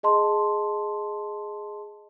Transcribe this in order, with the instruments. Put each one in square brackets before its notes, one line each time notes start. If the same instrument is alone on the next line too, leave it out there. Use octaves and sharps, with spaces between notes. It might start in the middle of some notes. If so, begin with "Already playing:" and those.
[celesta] G#4 D#5 A5 C6